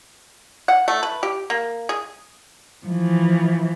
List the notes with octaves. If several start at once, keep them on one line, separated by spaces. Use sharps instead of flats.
F#5
A3
B4
G4
A#3
G#4
E3 F3